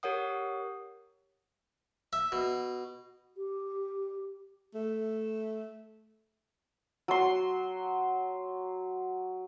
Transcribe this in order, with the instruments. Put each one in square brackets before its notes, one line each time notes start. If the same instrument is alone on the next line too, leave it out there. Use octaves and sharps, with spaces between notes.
[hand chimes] G4 A#4 C#5 F#5 D#6
[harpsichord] E5
B2
[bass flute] G4
[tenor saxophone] A3
[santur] F#3 C6